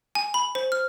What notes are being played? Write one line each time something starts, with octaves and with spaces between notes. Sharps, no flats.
G#5
B5
C5
F6